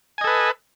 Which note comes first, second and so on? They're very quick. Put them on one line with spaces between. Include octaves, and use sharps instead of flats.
G#5 D#5 A4 B4